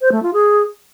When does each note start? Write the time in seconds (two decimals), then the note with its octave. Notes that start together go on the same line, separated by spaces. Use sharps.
0.01 C5
0.12 A3
0.23 F4
0.34 G#4